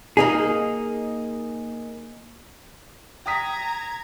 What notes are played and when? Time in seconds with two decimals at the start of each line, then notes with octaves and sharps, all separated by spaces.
0.17 A#3 D#4 G#4
3.26 G5 A#5 D#6 G#6 B6